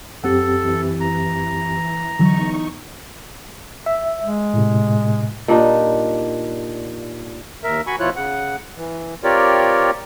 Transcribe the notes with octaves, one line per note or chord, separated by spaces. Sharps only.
F#2 C4 G4 A4 F#5
E3
A#5
E2 D3 E3 F#3 D#4 C#6
E5
G#3
A2 C3
A#2 G3 D4 D#4
D#2 A#4 E5
F#4 G#5 B5 C#6
B2 F3 E4 F4 C#5 F#6
C#3 F#5
E3
C4 F4 G4 A#4 C#5 D5